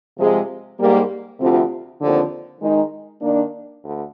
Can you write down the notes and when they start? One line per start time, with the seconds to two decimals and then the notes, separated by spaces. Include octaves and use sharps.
0.19 C3 F3 G#3
0.79 G#2 G3 A#3
1.39 D2 C3 F3 C4 F4
2.00 D#2 D3 F3 C4
2.61 D#3 G#3 D#4
3.21 D#3 A#3 D4
3.82 D2